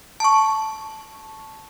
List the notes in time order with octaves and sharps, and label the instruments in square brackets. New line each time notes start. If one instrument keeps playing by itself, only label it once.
[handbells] A5 C#6